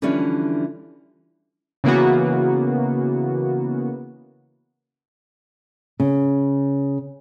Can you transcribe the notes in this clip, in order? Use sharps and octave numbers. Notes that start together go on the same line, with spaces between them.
D3 E3 F3 G3 C#4 D4
C#3 E3 A#3 B3 F#4
C#3